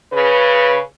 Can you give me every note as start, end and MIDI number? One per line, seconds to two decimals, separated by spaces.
0.13 0.80 49
0.13 0.80 71